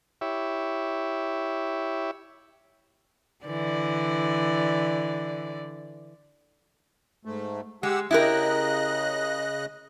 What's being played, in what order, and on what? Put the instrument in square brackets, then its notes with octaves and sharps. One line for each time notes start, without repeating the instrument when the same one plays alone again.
[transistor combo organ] E4 G4 C#5 E5
[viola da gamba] D3 E3 D5
[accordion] G#2 A3
[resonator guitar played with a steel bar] G#3 [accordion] G4 F#5 E6
[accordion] C#3 D#5 F#6 [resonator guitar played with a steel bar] E4 G4 A#4